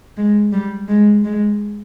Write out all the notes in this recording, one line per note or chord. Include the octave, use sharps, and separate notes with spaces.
G#3
G3
G#3
G#3